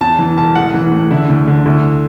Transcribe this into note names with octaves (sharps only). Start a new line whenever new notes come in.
E2 A5
E3
E1 A5
A1 F#5
E3
A2
D3 E4
D2
D3
D2 E4